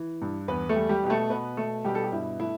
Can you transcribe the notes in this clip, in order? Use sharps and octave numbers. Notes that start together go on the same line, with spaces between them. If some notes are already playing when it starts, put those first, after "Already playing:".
Already playing: E3
G2
E2 B3 B4
A3 A4
G3
G3 G4
B2 G4
A3 A4
B2 B3 B4
B2 A3 A4
B2 G3 G4
A4
G4
G2 E4
A3 E4